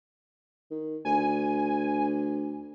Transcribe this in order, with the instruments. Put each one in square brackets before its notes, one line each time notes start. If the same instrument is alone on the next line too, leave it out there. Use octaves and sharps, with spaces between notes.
[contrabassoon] D#3
[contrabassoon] D2 [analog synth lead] G#5